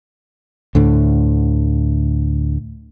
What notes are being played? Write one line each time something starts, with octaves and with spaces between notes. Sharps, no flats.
D2 A2 D3